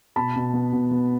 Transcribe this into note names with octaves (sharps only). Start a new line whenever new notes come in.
B2 A5 B5
B2
B3
B2
B3